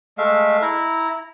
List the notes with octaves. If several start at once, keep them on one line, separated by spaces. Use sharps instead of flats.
G#3 A3 E5 F5
E4 A#5